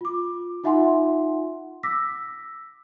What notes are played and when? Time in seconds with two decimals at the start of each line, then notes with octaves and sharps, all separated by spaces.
0.01 F4 D6
0.64 D#4 F4 E5 F#5 G#5 C6
1.83 D6 E6 A#6 B6